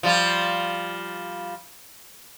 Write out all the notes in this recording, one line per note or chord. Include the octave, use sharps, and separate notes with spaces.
F3 G3 F4